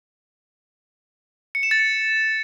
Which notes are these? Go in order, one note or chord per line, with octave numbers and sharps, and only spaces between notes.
C#7
E7
A6
C#7